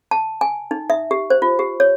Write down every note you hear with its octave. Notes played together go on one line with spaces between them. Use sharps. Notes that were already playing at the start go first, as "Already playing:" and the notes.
A5
G#5
D#4
E5
G4
C5
F4
G4
C#5